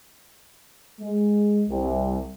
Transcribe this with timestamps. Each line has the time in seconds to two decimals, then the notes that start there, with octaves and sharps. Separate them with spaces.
1.01 G#3
1.70 C2